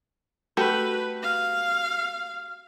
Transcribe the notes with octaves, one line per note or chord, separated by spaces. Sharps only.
A3 F#4 G4 B4
F5